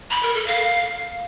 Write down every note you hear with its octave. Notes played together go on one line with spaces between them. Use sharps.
B5
A#4
A4
F5